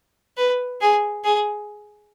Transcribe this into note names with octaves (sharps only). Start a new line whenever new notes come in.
B4
G#4
G#4